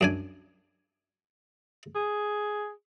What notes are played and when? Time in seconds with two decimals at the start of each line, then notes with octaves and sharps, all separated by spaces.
0.01 F#2 D4 G#5
1.95 G#4